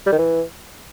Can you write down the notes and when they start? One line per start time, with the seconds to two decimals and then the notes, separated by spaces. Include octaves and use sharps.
0.06 G3
0.12 D#3
0.18 E3